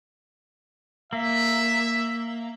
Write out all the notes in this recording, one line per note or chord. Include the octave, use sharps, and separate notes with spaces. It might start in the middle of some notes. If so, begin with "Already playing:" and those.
A#3 E5